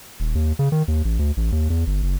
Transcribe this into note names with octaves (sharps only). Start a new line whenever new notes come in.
D#1
D#2
C#3
D#3
D#2
A1
D2
A1
D#2
E2
G1
F#1